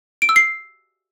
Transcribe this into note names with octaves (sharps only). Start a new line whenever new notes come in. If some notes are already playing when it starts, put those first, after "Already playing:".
D7
E6
C7